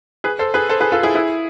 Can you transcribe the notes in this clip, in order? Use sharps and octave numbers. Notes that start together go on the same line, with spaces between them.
G#4 B4
A4 C5
G#4 B4
A4 C5
G#4 B4
F4 A4
E4 G#4
E4 G#4